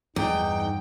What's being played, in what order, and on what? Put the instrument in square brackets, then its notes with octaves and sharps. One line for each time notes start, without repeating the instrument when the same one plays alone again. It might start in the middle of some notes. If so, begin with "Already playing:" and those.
[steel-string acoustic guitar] E2 [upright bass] G2 [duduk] D#4 [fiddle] G5